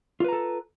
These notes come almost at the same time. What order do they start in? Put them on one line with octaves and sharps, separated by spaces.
F4 B4 A#5 A4